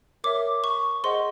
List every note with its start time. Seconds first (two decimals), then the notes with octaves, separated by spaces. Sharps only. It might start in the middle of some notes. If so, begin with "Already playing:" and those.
0.24 A#4 C#5 E5 D6
0.64 C#6
1.04 G#4 C5 D#5 F#5 C6